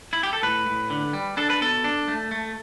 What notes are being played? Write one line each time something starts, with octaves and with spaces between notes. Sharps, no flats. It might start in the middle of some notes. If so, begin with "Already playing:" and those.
E4
G4
A4
A2 B4
A2
D3
G3
D4 A4
B4
B2 A4
D4
A3
A3